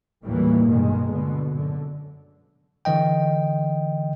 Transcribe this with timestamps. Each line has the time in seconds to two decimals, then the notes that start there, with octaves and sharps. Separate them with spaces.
0.24 D#2 A2 E3 F#3 G3 A#3
0.66 G1 B2 D#3 G#3
1.10 B2 D3
1.55 F#2 D3
2.85 D3 E3 D#5 G5